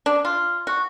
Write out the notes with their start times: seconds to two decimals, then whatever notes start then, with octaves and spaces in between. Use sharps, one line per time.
0.06 D4
0.25 F4
0.67 F#4